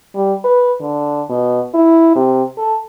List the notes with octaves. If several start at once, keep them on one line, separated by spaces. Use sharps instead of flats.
G3
B4
D3
B2
E4
C3
A4